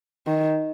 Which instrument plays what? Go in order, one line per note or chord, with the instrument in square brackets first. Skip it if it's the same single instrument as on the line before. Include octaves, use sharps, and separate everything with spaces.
[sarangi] D#3